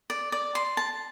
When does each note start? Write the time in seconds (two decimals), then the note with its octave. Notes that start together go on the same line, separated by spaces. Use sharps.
0.10 D5
0.32 D5
0.55 C6
0.77 A5